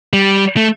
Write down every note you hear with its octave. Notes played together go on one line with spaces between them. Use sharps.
G3
A3